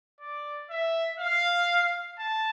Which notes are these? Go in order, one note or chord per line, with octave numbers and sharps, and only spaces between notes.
D5
E5
F5
A5